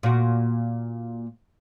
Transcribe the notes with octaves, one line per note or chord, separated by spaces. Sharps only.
A#2 F#4